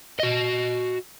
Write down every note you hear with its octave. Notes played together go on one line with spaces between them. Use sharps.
F#4 D#5